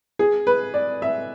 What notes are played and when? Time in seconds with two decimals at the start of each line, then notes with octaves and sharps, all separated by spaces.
0.19 G#4
0.47 B4
0.74 D5
1.02 E5